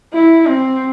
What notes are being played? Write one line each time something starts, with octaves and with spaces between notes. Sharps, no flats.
E4
C4